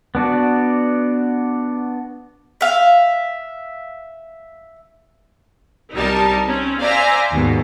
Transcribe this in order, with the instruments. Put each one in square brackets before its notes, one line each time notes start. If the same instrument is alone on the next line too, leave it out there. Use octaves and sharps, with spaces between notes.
[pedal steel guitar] B3 D4 F#4 D5
[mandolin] E5 F5
[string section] C2 G3 D#4 A#4 A5
C4 C#4
C5 D5 E5 F5 G#5 A#5
D#2 G#2 B2